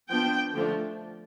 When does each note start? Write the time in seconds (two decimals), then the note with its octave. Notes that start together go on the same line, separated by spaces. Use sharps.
0.10 F3 B3 D4 G5
0.54 D3 F3 A3 D4